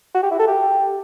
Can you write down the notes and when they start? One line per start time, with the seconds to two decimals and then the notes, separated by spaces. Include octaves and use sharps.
0.15 F#4
0.23 G4
0.31 E4
0.39 A4
0.48 G4